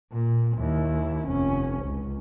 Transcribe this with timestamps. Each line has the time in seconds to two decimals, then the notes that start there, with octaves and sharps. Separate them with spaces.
0.12 A#2
0.58 D#2 E4
1.27 F1 C#4
1.85 C#2